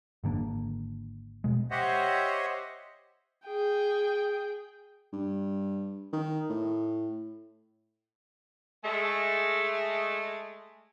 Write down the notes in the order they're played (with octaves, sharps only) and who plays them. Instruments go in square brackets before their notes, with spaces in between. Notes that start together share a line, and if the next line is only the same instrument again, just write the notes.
[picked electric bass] G#1 D3 A#3 D4
B2 G#3
[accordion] G4 C5 C#5 D#5 E5 F#5
[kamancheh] G#4 G5
[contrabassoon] G2
D#3
A2
[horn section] G#3 A3